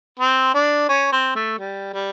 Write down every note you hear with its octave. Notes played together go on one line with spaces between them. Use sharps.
C4
D4
C#4
C4
A3
G3
G3